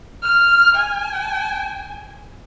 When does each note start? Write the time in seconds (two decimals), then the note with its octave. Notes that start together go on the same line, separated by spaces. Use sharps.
0.23 F6
0.75 G#5